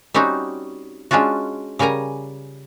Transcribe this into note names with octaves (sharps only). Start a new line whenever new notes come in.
G3 C4 C#4 D#4 F#4
G#3 C#4 D4 F4 F#4
C#3 G3 A#4 G#5 A#5